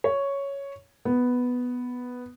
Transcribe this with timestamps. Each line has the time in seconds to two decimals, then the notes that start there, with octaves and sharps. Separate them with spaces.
0.04 C#5
1.05 B3